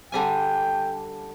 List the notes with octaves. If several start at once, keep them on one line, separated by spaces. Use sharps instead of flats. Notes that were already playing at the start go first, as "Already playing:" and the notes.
D3 G3 G5 G#5